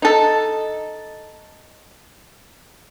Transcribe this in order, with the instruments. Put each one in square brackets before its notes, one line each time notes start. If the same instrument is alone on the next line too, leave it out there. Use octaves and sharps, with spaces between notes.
[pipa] D#4 A4